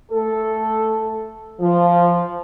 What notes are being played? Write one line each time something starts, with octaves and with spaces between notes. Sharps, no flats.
A3 A4
F3